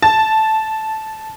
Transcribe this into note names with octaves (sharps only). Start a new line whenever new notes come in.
A5